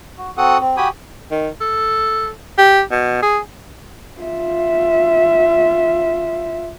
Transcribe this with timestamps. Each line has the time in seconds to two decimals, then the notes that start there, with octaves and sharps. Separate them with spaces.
0.18 F#4
0.37 C4 F#4 A4 F#5 D#6
0.60 C4
0.77 F#4 G4 G5 G#5 B5 D#6
1.31 D#3
1.61 A4
2.58 G4
2.91 B2
3.22 G#4
4.20 F4 E5